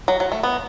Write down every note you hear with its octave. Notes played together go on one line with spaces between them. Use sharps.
F#3
F#3
A3
B3